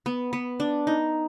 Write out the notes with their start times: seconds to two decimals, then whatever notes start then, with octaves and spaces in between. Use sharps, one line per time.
0.06 B3
0.33 B3
0.60 D4
0.87 D#4